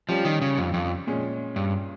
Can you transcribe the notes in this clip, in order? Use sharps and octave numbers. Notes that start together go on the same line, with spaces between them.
F3 G3 C#4 G4
D#3
C#3
F2
F2
A#2 G#3 C#4 G#4
G2